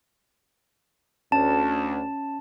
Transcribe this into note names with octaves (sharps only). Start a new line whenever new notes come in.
D2 C#4 A5